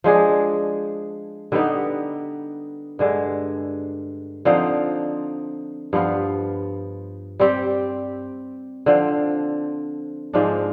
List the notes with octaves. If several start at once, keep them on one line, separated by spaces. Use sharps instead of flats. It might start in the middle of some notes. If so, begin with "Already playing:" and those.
F3 G#3 D4 G#4
D3 G3 B3 D#4
G2 D3 G#3
D3 F3 C4 D#4
G2 F3 B3 F4
G3 C4 G4
D3 F3 C4
G#2 F3 G#3 D4